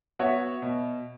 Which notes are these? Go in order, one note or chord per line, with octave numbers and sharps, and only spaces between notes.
B3 F#4 C#5 E5
B2